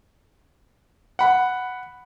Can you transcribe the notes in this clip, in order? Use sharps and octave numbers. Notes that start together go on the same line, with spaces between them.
F#5 B5